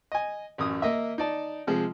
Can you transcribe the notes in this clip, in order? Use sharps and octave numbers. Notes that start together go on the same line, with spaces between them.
D#5 G#5
A1 F#2 D#6
A#3 D#5 E5
D#4 D5 A5
C3 F3 G#3